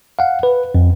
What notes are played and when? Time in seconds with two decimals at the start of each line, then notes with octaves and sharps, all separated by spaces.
0.19 F5 F#5
0.43 B4
0.75 F2